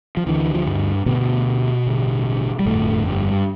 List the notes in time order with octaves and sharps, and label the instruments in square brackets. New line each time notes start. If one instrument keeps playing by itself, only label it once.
[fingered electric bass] F3
D2 D3 E3
F3
G2 G3
D2 B2 D3 B3
A1 G2 D3
G3
G1 F2 A2 D3 A3
G2 G3